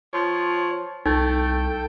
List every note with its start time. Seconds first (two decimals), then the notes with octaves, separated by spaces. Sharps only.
0.13 F3 C#5
1.06 C2 A3 D#4 A4 G5